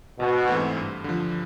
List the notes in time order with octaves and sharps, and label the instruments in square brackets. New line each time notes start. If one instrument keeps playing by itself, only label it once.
[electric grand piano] G#1 [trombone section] B2
[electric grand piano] G#2 E3 A3 C4
G2
D3 F3